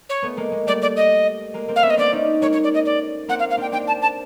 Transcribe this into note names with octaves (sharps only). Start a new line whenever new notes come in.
C#5
A3 B3
G#3 A#3
G#3
G3 A3 D5
D5
D#5
G#3 A#3
A#3 C4
F5
B3 C#4 E5
D#5
C4 D4 D5
C#4 D#4
G#3 A#3 C#5
C#5
D5
D#5
D5
A#3 C4 F#5
F5
F5
C4 D4 G5
C4 D4 G5
A5
A5